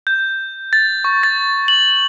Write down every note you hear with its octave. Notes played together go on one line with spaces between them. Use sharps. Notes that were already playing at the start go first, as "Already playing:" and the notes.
G6
A6
C#6
A6
F#7